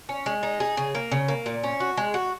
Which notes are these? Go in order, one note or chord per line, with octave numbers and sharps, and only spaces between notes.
C#4
G#3
D#4
G#4
C#3
A#3
C#3
A#3
A#2
C#4
F#4
G#3
F#4